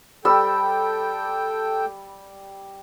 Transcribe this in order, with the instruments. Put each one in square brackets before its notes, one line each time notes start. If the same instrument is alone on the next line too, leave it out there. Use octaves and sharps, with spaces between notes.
[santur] G3 E6 [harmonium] A4 G5